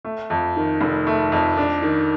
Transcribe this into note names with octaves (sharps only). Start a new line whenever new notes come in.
A3
F2
D#3
F1
A3
F2
D4
D#3